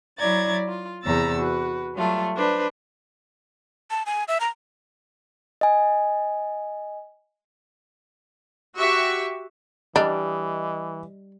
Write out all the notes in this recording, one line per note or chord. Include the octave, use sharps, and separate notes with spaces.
F#3 E4 D5 A#5 G#6 A6
F4
E2 C3 A#5 E6 A6
F#4 B4
F#3 G3 A3 F4
D4 B4 C5
A5
G#5
E5
A#5
D#5 G#5
F#4 G4 E5 C#6
E3 G3 D4 D#5